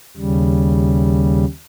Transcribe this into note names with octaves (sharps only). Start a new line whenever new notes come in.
D#2 C#3 G3